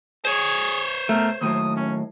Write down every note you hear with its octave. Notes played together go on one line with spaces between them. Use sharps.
G#4 C5 C#5
B2 A3 A#4
D#2 A2 F#3 D#6
C#4